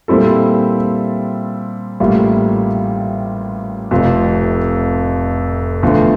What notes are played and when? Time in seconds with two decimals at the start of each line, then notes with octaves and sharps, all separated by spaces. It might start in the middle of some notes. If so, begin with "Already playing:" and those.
0.08 A#2 G3 C4 E4 A4
2.00 A1 A2 G3 A#3 F4
3.91 F1 F2 C3 F3
5.83 E2 D3 F3 A3